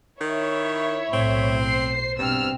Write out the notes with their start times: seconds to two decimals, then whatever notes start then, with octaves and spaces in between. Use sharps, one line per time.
0.21 D#3 E4 C#5 E5
1.13 B1 A2 C4
1.60 C5 C7
2.19 G2 B2 C4 E6 F6